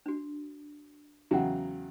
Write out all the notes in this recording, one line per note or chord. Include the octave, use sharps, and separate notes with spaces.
D4 F#4
E2 C#3 F#3 F#5 G5 A#5